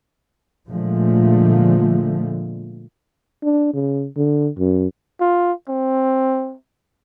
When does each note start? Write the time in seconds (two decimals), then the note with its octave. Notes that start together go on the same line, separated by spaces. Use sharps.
0.69 A#2 D3 F3 G#3 A3
3.43 D4
3.74 C#3
4.17 D3
4.59 F#2
5.20 F4
5.69 C4